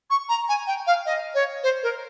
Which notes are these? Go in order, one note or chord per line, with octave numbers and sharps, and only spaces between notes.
C#6
A#5
G#5
G5
F5
D#5
C#5
C5
A#4